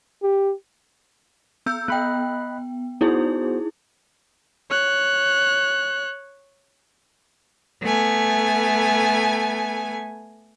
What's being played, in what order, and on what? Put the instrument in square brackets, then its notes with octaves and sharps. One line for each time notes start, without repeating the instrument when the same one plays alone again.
[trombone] G4
[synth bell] B3 E6 G6
[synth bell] B3 G5 [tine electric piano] D#5 B5 F#6
[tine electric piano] B3 F#4 C5 [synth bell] D#4 E4 G#4
[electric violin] C#5 F#6
[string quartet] A3 B3 G#5